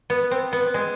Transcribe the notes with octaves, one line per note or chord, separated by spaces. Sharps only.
B3
C4
B3
G#3